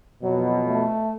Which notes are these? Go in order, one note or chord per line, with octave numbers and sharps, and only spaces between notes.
F2 B2 F#3
A3